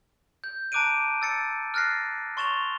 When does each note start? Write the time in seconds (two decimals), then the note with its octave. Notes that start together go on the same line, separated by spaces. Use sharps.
0.44 G6
0.72 A5 A#5 D6 F#6 D7 D#7
1.22 E6 A6 C#7
1.74 F6 F#6 A6 A#6 C7
2.37 C6 C#6 A6 E7 F7 G7